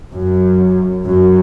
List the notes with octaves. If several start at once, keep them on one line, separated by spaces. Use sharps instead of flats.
F#2
F#2